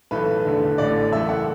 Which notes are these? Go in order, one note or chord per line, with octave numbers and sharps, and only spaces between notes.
B1 A2 E3 A3 B4
E2 D3 A3
A1 A2 A3 D5
F#1 E2 E3 A3 E5
F#5